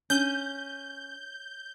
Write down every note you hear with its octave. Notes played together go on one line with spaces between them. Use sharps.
C#4 G6